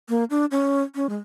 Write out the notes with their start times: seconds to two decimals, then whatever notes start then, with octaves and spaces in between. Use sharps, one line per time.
0.09 A#3
0.30 D4
0.51 C#4
0.95 C#4
1.09 G#3